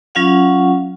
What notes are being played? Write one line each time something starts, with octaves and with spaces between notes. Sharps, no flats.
F#3 C#4 F4 F5 F#5